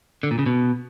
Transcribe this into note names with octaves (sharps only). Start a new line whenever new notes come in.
D3
A#2
C#3
B2